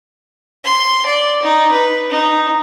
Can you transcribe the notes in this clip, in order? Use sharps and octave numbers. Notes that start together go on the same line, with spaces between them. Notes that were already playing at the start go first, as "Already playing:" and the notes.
C6
D5
D#4
B4
D#4